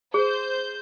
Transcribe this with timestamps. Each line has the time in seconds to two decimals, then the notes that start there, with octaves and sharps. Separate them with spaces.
0.14 G#4 C5 G6